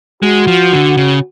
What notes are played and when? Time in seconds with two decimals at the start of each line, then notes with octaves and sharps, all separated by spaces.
0.23 G#3 F#4
0.47 F3
0.73 D3
0.97 C#3